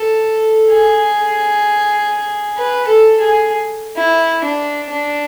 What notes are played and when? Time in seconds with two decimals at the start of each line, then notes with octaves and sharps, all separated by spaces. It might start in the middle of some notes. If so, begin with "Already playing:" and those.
Already playing: A4
0.71 G#4
2.57 B4
2.88 A4
3.20 G#4
3.97 E4
4.45 D4
4.90 D4